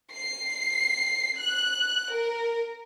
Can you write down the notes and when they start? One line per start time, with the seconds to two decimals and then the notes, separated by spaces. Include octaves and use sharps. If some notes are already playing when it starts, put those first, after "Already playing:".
0.12 C7
1.39 F#6
2.13 A#4